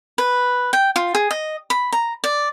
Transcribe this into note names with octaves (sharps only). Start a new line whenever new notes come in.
B4
G5
F4
G#4
D#5
B5
A#5
D5